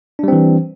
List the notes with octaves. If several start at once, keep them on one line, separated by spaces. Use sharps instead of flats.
E3 G3 C4 D4